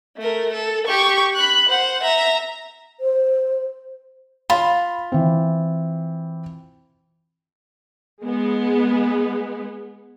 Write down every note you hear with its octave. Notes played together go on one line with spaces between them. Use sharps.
A3 A#4
A4
G4 C#6
B5 F#6
C5 F#5
E5 A#5
C5
F4 B5
E3 C4
G#3 B3